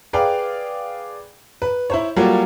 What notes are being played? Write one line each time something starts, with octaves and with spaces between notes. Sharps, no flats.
G#4 B4 D5 F5 G5
B4
E4 C5 C#5
F#3 G3 A#3 F4 A4